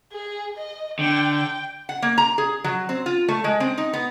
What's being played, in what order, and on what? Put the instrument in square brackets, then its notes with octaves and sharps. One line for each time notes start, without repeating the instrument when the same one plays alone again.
[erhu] G#4
D#5
[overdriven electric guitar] D3 [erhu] G5
[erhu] G5
[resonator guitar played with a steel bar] F#5
A#3
A#5
G#4
F#3
C4
F4
A3
G#3
C4
D#4
B3